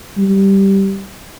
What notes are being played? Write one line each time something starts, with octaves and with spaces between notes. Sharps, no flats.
G3